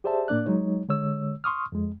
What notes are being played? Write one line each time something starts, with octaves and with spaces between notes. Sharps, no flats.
G4 G#4 C5 D5 E5 A5
A2 A#3 D4 D5 F#6
F#3 G#3 D#4 C#5
D3 G#3 C#5 E6
C6 C#6 D#6 F6
F2 G#3